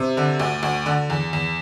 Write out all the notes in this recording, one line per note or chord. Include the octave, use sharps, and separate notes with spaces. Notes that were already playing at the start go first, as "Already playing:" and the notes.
Already playing: C3
D3
D2
D2
D3
E2
E2